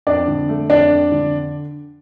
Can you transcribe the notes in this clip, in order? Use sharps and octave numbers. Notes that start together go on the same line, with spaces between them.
F2 D4 D5
D3
A3
F2 D4 D5
F2
D3